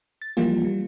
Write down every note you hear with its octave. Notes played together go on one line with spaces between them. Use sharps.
A6
E3 F3 G3 A#3 F4
G3